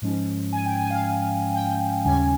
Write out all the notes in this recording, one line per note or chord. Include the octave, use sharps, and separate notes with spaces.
G#2 F3 G#3 C#4
G#5
G5
G#5
F5
G5
D#2 C#3 G3 C#4 G#5